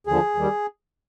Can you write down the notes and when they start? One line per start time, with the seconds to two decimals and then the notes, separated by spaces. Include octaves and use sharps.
0.07 D#2 D3 F3 G#4
0.35 D#2 D#3 G3